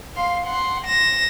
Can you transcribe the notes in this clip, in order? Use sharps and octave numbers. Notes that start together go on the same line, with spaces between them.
F5 C6
F#5 C6
A#6 E7